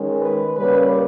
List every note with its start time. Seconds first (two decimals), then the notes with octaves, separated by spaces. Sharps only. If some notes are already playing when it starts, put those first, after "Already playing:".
Already playing: D#3 G#3 C#4
0.22 B4
0.56 C#3 G3 A#3 C#4 B4